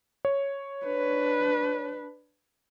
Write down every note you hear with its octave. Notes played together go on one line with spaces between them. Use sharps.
C#5
D4 B4